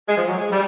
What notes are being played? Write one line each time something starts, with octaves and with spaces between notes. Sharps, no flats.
G#3
F3
F#3
G#3
G3